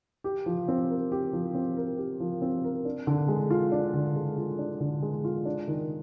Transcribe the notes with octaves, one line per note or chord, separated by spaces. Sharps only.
G4
F3
C4
A#4
G4
F3
C4
A#4
G4
F3
C4
A#4
D4
D3
G#3
F4
D4
D3
G#3
F4
D4
D3
G#3
F4
D4
D#3